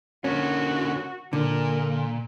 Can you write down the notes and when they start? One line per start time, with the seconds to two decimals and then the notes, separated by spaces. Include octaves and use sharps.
0.24 D3 A#3 C#4 F#4
1.33 A#2 D3 A#4